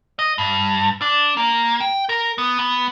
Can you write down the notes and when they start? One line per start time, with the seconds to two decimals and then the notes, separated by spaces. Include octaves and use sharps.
0.19 D#5
0.38 G2
1.01 D4
1.37 A#3
1.80 G5
2.09 A#4
2.38 B3
2.59 B3